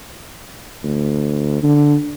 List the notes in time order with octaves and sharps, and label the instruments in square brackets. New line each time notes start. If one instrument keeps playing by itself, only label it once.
[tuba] D2
D3